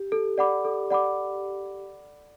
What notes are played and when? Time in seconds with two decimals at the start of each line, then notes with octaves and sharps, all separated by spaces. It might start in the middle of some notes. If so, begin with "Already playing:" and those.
Already playing: G4
0.12 A4
0.38 D5 F#5 B5 D6
0.65 A4
0.90 D5 F#5 B5 D6